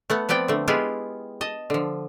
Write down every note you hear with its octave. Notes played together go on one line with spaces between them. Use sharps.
A3 B3 F#5
F3 B3 C4 D5 G5
D3 A3
G#3 B3 E4 F4 G4 G#4
D#5 A5
D3 F3